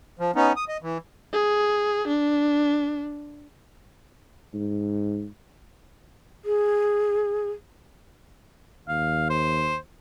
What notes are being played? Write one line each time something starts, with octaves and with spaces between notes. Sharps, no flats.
F3
B3 C#4 D#4
D#6
D#5
E3
G#4
D4
G#2
G#4
D#2 F5
C5